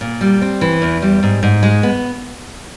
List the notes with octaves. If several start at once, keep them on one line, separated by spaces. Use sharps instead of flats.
A#2
G3
C4
E3
E2
G3
G#2
G#2
G#3
B3